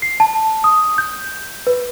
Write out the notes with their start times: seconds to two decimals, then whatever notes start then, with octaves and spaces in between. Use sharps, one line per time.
0.02 C7
0.20 A5
0.64 D#6
0.98 G6
1.67 B4